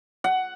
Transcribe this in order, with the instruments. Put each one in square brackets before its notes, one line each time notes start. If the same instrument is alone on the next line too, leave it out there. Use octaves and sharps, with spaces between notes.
[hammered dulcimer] F#5